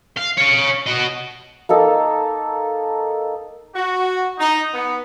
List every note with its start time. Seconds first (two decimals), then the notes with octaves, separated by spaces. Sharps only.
0.17 F5
0.37 C#5 F5
0.86 F#4 D#5
1.69 A#3 D#4 A4 A#4
3.75 F#4
4.39 D#4
4.74 B3